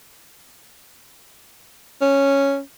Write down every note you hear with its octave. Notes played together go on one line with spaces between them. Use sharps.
C#4